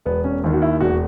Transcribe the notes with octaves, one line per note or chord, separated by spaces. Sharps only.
E1 B3
C#4
D#2 D#3
F#4
E4
E1 F#4